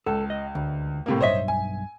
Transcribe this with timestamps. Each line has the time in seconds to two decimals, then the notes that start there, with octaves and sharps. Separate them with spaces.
0.06 C#2 A4
0.30 D#5
0.55 D2
1.06 A2 C3 A#3
1.21 B1 G2 C5 C#5 D#5 E5
1.48 G#5